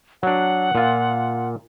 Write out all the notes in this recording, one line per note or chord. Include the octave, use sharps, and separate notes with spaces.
F#3 D4 F#5
A#2 F4